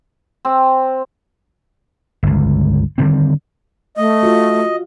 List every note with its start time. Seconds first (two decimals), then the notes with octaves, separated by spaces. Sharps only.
0.45 C4
2.23 G1 C#2
2.98 D3 D#3 G3 C4
3.97 A3 D#5
4.23 F4 F#4